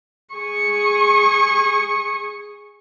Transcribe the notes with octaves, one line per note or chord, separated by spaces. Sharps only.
G#4 C#6